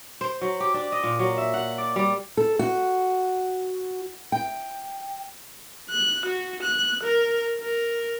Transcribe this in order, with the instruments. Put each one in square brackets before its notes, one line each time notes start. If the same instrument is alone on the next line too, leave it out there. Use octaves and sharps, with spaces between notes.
[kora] C5
F#3
G4
D4
D#5
A#2
F#3
E5
F#5
D5
G3
[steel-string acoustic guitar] A4
F#4
G5
[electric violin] F#6
F#4
F#6
A#4
A#4